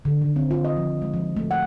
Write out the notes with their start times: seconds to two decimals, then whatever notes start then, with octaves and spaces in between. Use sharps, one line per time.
0.05 D3
0.22 D#3
0.36 C4
0.51 F4
0.64 D#5
0.77 F3
1.02 G#3
1.14 F3
1.37 A3
1.51 F#5